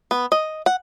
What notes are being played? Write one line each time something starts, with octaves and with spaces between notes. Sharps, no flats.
B3
D#5
F#5